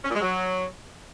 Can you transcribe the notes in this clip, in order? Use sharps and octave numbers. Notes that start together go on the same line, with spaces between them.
C#4
A#2
G#3
F#3